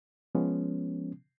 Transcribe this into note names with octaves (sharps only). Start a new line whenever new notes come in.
F3 G#3 B3 C#4